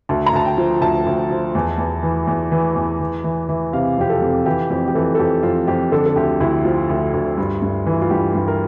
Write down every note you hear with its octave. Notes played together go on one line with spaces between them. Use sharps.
D2 A5
A#5
D2 A5
G5
F3
D2 A5
D2
F3
E2
E2
E3
E2
E3
E2
E3
E3
E3
C3 F5
F2 G4
A4
F2
E3 G4
F2 G4
G4
E3 A4
A4
F2 G4
F2 F4
F2 G4
D3 A4
A4
D2 G4
D2 E4
F3 F4
D2
D2
G2
G2
E3
F4
G2 G4
G2
A#4